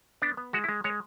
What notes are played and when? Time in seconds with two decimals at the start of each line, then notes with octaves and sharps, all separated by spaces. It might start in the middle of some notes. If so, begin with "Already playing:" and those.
0.22 B3 D4
0.37 B3
0.53 G#3 F#4
0.64 E4
0.69 G#3
0.84 G#3 C#5